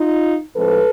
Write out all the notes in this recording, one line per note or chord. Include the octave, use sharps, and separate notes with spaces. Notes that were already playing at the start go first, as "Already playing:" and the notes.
Already playing: D#4 F4
A2 F3 G#3 C4 A4 B4